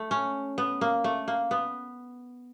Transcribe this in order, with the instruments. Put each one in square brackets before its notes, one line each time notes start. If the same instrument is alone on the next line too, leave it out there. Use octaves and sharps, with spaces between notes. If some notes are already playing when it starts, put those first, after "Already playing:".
Already playing: [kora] A3
C#4
B3
A#3
A3
A#3
B3